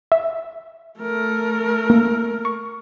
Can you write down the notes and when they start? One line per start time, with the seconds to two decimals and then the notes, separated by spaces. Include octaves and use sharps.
0.12 E5
0.99 A3 A#4
1.90 A#3
2.45 C#6